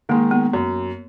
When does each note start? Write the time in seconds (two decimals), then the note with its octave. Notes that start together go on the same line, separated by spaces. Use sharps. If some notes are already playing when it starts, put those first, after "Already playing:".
0.09 D#3 G#3 A#3
0.31 B3
0.53 F#2